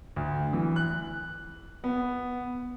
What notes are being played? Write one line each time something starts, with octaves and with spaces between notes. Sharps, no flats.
D2
E3
F#6
B3